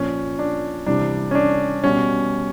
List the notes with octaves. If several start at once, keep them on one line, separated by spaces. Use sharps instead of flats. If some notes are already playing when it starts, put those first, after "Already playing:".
Already playing: A#2 F3 C#4
D4
C3 E3 G3 D4
C#4
D4
B2 G3 C#4